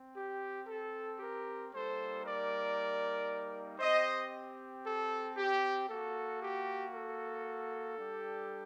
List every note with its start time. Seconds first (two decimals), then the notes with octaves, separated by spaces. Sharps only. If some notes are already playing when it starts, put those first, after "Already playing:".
Already playing: C4
0.15 G4
0.67 A4
1.19 G4 A#4
1.72 G3 A#3 D#4 A4 C5
2.24 A#4 D5
3.79 C4 G4 C5 D#5
4.84 A4
5.36 G4
5.87 A#3 F#4 A4
6.40 G4
6.92 A4
7.97 G3 D4 G4